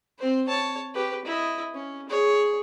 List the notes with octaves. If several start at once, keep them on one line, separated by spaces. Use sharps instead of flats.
C4 C5
C#5 A5
G4 B4
E4 D#5
C#4
G#4 C#5